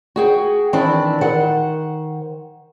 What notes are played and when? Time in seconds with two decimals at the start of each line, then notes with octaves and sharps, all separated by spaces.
0.16 F#4 G#4 G5
0.73 D#3 E3 C4 D4 E4
1.21 D#3 C5 F#5